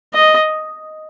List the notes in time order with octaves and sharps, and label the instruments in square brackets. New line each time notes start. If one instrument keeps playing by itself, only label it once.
[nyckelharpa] D#5